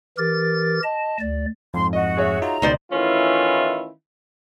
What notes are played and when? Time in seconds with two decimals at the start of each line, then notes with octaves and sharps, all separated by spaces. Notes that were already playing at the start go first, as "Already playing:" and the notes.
0.18 E3 G4 A#4 A6
0.83 D#5 A5
1.20 D2 D5
1.74 F2 G#2 C6
1.93 F#4 D#5
2.17 G#4 C#5 E5
2.42 D#4 F4 F#4 A#5
2.62 C#2 B2 D#3 D#4 C5 D5
2.92 D#3 E3 A3 C#4 E4 F4